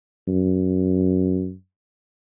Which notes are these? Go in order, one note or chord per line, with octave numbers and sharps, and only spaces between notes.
F#2